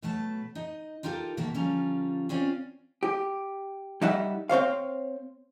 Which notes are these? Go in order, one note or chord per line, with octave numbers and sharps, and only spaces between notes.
B2 F#3 A3 B4 A5
D#4 D#5
D#4 F4 G4 A4 A#4
B2 D#3 A#3 F#4 E5 A5
D3 F3 G3 C#4 F4 A#5
C4 C#4 F4 D5
G4
G3 D#4 E5 F#5
C4 C5 C#5 F5